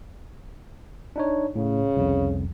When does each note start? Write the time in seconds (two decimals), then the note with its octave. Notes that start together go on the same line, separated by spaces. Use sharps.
1.16 D4 D#4 C#5
1.55 A2 C#3
1.96 C2 F2